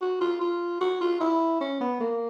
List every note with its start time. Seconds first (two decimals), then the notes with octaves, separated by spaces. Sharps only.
0.01 F#4
0.21 F4
0.41 F4
0.81 F#4
1.01 F4
1.20 E4
1.61 C#4
1.81 B3
2.00 A#3